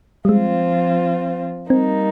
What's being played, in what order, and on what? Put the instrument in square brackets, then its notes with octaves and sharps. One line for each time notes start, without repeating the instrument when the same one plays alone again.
[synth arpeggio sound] G3
[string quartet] F3 C4 F4 [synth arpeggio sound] G#3
[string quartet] G3 A#3 D#4 [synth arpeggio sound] C4